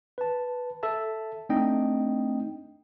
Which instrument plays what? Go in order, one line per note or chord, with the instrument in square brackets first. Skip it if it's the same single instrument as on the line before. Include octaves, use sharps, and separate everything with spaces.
[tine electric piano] B4 A5
A4 E5 A5
A3 C4 D4 D#4 D#5 G5